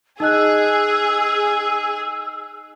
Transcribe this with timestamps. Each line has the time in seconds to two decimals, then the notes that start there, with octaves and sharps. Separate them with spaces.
0.20 D#4 G#4 D#5 E6 F#6